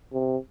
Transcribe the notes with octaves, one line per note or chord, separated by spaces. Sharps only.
C3